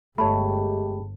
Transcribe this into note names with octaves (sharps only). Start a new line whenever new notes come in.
G1 G#3 A3 G4 C#5 A5 B5